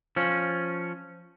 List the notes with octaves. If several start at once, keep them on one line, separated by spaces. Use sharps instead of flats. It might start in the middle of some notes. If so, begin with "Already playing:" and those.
F3 C#4